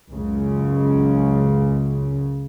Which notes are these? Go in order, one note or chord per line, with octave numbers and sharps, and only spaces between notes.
C#2 F#2 C#3